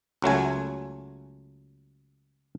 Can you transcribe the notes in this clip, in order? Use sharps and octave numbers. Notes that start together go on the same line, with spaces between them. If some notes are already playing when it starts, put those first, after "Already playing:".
C#2 F#3 A3 G#5